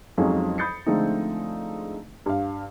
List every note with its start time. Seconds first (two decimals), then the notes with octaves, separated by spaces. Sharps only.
0.18 F2 F3 F#3 G#3 C#4 D#4
0.58 B5 D#6 G6 A6 C7 C#7
0.86 D3 F3 G#3 A3 C4 D#4
2.26 G2 F5